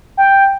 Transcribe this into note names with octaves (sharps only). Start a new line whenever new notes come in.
G5